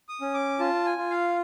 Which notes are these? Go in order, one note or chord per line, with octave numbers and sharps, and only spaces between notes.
D#6
C#4
D6
F4 A5
G#5
F4
F5